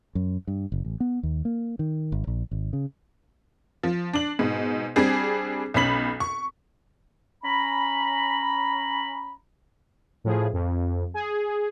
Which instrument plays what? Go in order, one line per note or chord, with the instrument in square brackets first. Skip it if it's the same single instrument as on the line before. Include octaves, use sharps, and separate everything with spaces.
[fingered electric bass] F#2
G2
F#1
A1
B3
D#2
A#3
D#3
G#1
A#1
G#1
C#3
[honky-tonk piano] F3
D4 F#7
G#2 B2
G3 C4 D4 G#4
B1 C#4 B5 B6 F#7
C#6
[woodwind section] C#4 A#5 B5
[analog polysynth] A2 F3 G#4
F2
G#4